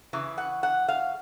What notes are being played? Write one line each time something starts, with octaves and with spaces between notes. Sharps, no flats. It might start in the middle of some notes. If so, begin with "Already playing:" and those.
C#3 E3
F#5
F#5
F5